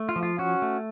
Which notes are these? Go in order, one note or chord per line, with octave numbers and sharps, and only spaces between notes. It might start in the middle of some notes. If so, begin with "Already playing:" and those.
Already playing: A3
F4
F3
F4
C#4 F#4
A3